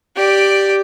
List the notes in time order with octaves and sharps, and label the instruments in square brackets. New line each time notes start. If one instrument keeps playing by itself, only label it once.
[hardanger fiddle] G4 D5